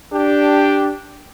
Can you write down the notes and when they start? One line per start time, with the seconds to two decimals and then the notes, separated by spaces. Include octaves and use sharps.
0.12 D4 G4